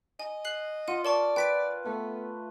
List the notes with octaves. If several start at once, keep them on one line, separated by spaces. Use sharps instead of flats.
D#5 G#5
F#6 C7 F#7
F4 F#5 D#7
A#4 D5 A5 C#6
B4 G5 B6 D7
A3 B3